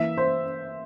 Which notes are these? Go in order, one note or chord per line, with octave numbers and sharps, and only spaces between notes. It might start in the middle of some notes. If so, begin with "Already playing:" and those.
Already playing: E3 A#3 E5
C5